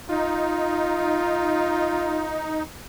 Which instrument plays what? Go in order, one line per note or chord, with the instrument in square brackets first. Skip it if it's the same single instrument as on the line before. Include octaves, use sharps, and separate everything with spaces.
[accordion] D#4 [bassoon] F4